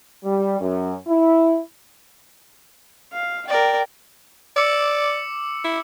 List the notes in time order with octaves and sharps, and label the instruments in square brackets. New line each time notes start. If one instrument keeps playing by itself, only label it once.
[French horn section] G3
F#2
E4
[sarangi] F5
[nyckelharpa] A#4 D5 [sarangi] G5
[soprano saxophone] D5 [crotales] D6 E6 C#7
[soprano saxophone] E4